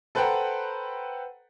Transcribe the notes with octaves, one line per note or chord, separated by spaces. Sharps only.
A4 B4 C5 F#5 G5 A#5